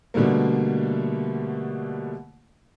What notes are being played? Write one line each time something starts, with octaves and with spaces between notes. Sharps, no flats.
B2 D3 G3 A3 A#3